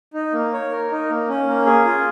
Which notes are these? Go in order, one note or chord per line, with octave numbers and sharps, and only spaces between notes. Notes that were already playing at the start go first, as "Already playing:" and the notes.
D#4
A#3
C#5
A#4
D#4
A#3
C#4
A#3
G#4
F4